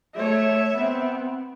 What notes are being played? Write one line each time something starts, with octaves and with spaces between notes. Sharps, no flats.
A3 C#5 E5
B3 C4